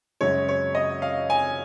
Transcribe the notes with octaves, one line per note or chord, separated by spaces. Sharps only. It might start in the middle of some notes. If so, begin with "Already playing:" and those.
F#2 C#3 G#3 C#5
C#5
D#5
F5
G#5